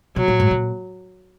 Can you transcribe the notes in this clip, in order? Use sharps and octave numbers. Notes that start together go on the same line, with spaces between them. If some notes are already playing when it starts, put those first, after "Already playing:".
B2 F#3
A#2
G#2
A#2